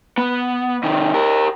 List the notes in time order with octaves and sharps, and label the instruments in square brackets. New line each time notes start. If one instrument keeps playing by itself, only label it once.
[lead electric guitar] B3
C3 D#3
G4 A#4